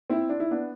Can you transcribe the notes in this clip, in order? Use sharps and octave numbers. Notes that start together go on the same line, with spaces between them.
C4 E4
D4
E4
B3 D4